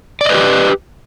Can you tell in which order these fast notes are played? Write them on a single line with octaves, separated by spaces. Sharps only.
D5 D#5 B4 G4